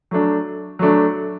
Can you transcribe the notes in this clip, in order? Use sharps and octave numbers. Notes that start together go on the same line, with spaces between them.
F#3 A3 D4
F#3 A3 D4